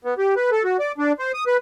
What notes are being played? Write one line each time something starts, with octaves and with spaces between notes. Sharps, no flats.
B3
G4
B4
A4
F#4
D5
D4
C5
D#6
B4